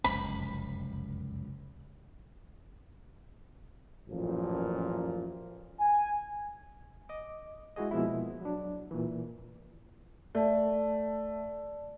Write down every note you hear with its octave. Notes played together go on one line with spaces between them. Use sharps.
F1 C#2 F#2 B5
A1 F#2 A#2 F3
G#5
D#5 D6
G#3 E4 F#4 G#4 D#5
B2 F3 G#3 A#3 E4
F#3 D4
A#2 E3
A3 D5 A5